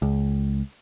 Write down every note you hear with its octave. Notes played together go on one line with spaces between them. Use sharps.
C#2